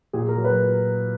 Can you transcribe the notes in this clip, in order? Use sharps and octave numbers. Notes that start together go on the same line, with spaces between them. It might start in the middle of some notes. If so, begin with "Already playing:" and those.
A#2 G#4
A#4
F#3
B4